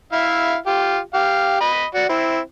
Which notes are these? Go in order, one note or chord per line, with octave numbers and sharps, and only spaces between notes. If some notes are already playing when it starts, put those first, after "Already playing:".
E4 E5 F5
F4 G4
G4 F5
D#5 B5
F#4 D5
C4 E4